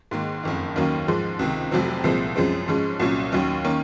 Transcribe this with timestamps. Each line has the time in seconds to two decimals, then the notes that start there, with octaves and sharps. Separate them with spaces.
0.11 G#2 D#3 A#3
0.43 F#1 F2 D#3
0.76 D#2 D#3 F#3 A#3 C#4
1.08 G#2 F3 G#3
1.39 C#2 C3 D#3
1.71 F1 F2 C3 F#3 C4
2.04 C2 A#2 F3 G#3 C4
2.36 F#2 F3 G#3 C4
2.68 G#2 F3 G#3 C#4
3.00 C2 A#2 F#3 C#4
3.32 D#2 D#3 F#3 C#4
3.64 D#3 A#3 C#4